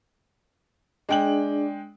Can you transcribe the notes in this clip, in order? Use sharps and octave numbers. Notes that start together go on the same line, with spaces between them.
G#3 D4 G#4 D5 G5 F#7